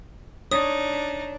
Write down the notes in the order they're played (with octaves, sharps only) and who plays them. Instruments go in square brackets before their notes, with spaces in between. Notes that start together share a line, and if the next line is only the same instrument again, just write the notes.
[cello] D4 [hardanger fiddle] D#4 [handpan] C#5 [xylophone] D#6